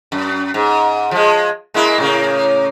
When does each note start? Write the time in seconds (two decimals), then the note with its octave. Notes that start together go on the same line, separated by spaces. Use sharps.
0.12 F#2
0.54 G#2
1.11 F3 G#3
1.74 G#3 A#3 E4
1.98 A2 C#3 A#3